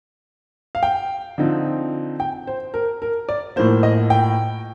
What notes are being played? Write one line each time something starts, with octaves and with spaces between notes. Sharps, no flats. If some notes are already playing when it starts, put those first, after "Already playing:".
F5
G5
D3 F3 C4 D#4
G5
C5
A#4
A#4
D5
A2 F3 A#3 C5
D#5
G5